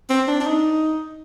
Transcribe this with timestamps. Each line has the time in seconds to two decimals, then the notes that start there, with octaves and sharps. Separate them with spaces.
0.09 C4
0.27 D4
0.40 D4
0.45 D#4